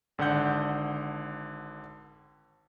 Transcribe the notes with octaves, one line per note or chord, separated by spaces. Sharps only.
G#1 D3 A4 F#5 G6